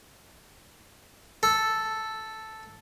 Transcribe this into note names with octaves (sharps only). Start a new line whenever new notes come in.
A4